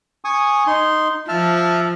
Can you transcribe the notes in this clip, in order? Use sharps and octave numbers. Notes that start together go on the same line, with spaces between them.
G#5 C#6 D#6
D#4 C6
F3 E5 A5 F6